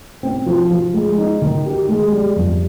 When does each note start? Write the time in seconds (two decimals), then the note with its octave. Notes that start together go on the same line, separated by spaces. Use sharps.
0.23 C4
0.46 F3
0.71 F3
0.94 G#3
1.18 D#4
1.42 D#3
1.66 G4
1.89 G#3
2.12 G3
2.36 F2